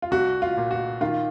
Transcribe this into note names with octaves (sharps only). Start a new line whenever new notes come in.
F4
C2 F#4
F4
A#2
F#4
D#3 F4